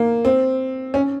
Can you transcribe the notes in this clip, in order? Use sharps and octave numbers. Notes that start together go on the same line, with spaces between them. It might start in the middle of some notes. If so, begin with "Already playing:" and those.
Already playing: A#3
C4
C#4